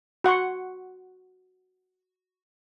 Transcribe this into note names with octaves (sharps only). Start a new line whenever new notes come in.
F#4 F#5 C6 C#6